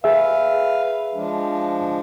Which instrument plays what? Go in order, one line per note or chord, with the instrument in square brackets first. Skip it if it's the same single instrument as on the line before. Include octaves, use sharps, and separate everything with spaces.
[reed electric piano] G#4 E5 [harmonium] B4 F5
[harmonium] F3 G#3 D4